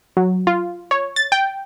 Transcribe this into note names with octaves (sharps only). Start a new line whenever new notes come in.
F#3
F4
C#5
A6
G5